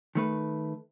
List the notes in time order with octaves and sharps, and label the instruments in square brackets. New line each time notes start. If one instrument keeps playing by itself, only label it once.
[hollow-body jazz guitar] D#3 A3 B4